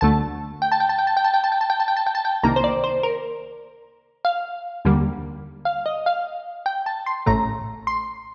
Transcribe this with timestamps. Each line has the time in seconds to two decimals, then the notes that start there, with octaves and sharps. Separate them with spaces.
0.01 D2 D3 A3 A5
0.62 G5
0.72 A5
0.80 G5
0.89 A5
0.98 G5
1.07 A5
1.17 G5
1.24 A5
1.34 G5
1.44 A5
1.52 G5
1.61 A5
1.70 G5
1.80 A5
1.88 G5
1.97 A5
2.07 G5
2.15 A5
2.25 G5
2.43 C2 C3 D#3 A#3 A#5
2.56 C5
2.64 D5
2.84 C5
3.03 A#4
4.25 F5
4.85 D#2 D3 G3 A#3
5.65 F5
5.86 D#5
6.06 F5
6.66 G5
6.86 A5
7.06 C6
7.26 A1 A2 A3 A#5
7.87 C6